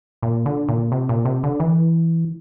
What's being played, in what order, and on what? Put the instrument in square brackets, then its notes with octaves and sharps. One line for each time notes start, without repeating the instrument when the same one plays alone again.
[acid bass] A#2
D3
A#2
C3
A#2
C3
D3
E3